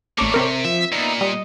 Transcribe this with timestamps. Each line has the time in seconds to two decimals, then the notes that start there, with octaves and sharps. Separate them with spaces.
0.18 A1 A2 A#3 A4 C#5 D5 D6
0.34 C3 C4 A#4
0.65 F3 E5
0.92 A#2 B3 D#4 E5
1.21 G3 D#5